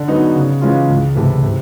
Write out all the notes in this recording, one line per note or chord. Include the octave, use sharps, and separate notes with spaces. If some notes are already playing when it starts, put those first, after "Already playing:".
Already playing: D3
F#3 B3 D#4
C#3
E3 G#3 C#4 F4
C#2
C3 E3 A3
C3